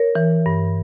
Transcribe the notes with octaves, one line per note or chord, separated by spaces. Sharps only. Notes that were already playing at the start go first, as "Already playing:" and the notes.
Already playing: A#4 C#5
E3
G2